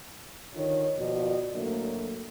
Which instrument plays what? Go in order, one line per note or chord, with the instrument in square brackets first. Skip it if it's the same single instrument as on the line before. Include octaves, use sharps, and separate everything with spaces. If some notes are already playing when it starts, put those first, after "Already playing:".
[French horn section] D3 D#3 F4 C#5
D#2 B2 F3 F#4 D5 D#5
A2 D3 F#3 A3 A#3